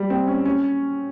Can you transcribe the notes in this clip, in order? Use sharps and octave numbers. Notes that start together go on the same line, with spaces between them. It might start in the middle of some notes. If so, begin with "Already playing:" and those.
Already playing: G3
C4
C#4
C#4